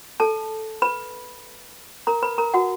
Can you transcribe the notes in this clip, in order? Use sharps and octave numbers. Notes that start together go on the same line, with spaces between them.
A4 A5
B4 B5
A#4 A#5
B4 B5
A#4 A#5
F#4 F#5